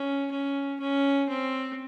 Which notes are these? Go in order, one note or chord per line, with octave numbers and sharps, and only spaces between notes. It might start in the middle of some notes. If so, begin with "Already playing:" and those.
Already playing: C#4
C#4
C#4
C4